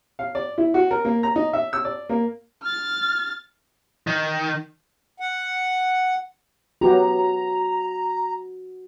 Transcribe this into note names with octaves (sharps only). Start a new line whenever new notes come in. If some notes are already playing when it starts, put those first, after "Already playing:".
F5
D5
E4
F#4
A#4
A#3
A#5
D#4
E5
E6
D5
A#3
F6 A6
D#3
F#5
F#3 B3 F#4 G4 A#5